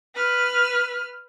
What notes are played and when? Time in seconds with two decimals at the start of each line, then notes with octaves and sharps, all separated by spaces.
0.15 B4 F6